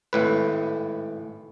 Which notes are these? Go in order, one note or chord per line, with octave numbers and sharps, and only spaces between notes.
G#1 A2 B4